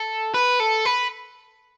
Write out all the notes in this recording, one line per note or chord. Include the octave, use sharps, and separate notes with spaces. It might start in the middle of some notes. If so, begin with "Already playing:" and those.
Already playing: A4
B4
A4
B4